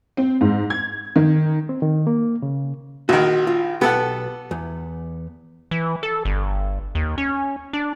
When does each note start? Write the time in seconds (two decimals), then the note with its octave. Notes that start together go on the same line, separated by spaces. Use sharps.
0.17 C4
0.41 G#2
0.70 G#6
1.16 D#3
1.69 C4
1.82 D#3
2.07 A#3
2.42 C#3
3.09 A#1 D#3 F#4
3.47 F4
3.81 B1 B3 G4 A4 F#5
4.51 E2
5.71 E3
6.03 A4
6.25 G1
6.95 D#2
7.18 C#4
7.73 D4